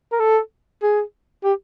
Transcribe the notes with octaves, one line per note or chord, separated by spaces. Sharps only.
A#4
A4
G#4
G4